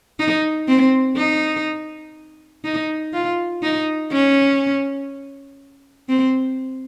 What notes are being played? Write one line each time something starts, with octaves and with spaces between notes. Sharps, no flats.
D#4
C4
D#4
D#4
F4
D#4
C#4
C4